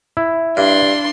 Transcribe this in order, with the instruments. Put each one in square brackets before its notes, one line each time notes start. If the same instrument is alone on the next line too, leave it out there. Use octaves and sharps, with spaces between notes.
[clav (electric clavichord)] E4
[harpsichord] G2 [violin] D4 C6